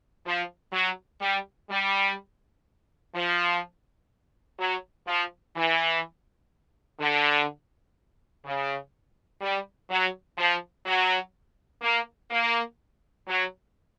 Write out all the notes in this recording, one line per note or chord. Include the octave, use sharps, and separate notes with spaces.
F3
F#3
G3
G3
F3
F#3
F3
E3
D3
C#3
G3
F#3
F3
F#3
A#3
A#3
F#3